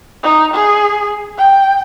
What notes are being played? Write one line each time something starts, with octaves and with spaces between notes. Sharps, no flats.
D#4
G#4
G5